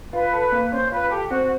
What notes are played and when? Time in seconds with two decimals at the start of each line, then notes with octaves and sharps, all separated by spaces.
0.13 F4 B4
0.33 A4
0.52 A#3
0.71 C#4 C5
0.91 F4 B4
1.10 G4 A4
1.30 C4 F#4